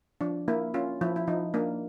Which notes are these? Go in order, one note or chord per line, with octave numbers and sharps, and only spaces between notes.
F3 D4
A#3 E4
C#4 F4
F3 E4
E4
F3 D#4
A#3 D4